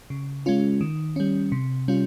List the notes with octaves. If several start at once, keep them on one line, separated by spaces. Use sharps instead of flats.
C#3
G#3 C#4 F4
D#3
G3 C#4
C3
G3 C#4 F4